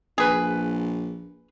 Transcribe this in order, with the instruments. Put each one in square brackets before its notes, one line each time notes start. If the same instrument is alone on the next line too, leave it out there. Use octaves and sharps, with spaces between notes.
[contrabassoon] A#1 [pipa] G#4 B4